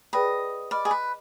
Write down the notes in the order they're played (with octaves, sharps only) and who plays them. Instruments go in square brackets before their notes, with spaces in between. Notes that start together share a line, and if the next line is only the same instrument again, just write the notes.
[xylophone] G#4 B4 D5 G5 B5 [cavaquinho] D#5
[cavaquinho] D5 [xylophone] D#5 B5 F6
[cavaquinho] G#4
B4